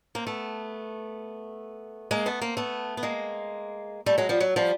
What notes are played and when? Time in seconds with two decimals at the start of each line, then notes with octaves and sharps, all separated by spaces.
0.15 A#3 C4
0.27 A3 B3
2.11 G#3 A#3
2.26 A3 B3
2.42 A#3 C4
2.57 A3 B3
2.97 B3
3.03 G#3 A#3
4.06 G3 A3
4.18 F#3 G#3
4.29 F3 G3
4.40 F#3
4.56 F3 G3